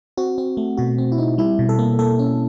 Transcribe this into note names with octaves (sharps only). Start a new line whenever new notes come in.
C4 F#4
C4
A3
B2 F#4
C4
E4
C4 D#4
G3 E4
B2
A4
A#3
A#3 A4
C#4